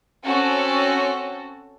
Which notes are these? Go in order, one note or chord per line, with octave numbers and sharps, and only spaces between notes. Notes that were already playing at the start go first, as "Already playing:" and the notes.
C4 C#4 F#4 A4